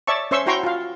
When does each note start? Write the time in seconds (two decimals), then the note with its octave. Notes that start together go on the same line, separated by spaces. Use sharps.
0.07 C#5 D5 E5 A5 C#6
0.31 C#4 C5 E5 C6 C#6 E6
0.46 E4 F#4 G5 A#5 C6 C#6
0.63 F4 F5